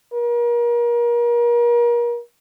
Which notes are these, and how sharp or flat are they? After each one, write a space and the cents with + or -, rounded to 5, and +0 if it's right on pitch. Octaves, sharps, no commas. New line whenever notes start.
A#4 +35